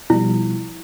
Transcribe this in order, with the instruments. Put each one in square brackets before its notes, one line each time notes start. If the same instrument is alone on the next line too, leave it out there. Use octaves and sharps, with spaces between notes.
[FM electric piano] B2 F3 G3 [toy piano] E4